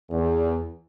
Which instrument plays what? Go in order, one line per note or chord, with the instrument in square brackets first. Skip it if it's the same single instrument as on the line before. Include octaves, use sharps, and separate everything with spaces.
[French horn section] E2